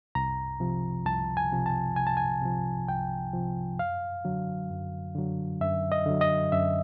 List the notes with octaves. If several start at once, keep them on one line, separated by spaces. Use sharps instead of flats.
C2 A#5
C3 F3
C2 A5
G#5
C3 F3
A5
C2 G#5
A5
G#5
C3 F3
C2 G5
C3 F3
F#2 F5
D3 F#3
F#2
D3 F#3
F#2 E5
D#5
D3 F#3
D#5
F#2 E5